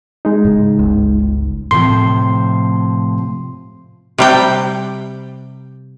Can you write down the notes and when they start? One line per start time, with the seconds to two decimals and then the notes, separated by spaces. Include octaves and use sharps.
0.25 G#3 D#4
0.45 G#2 C#3
0.79 G1 C#2
1.71 A2 C3 F3 C6
4.18 C3 G3 G5